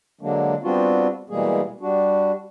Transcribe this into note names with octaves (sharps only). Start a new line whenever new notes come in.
D3 F#3 G#3 A#3 D4
G3 B3 C4 D4 F4 F#4
B2 E3 G3 G#3 A#3 G#4
G3 D4 F#4